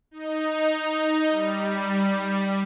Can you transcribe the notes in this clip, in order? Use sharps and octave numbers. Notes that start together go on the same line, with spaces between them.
D#4
G3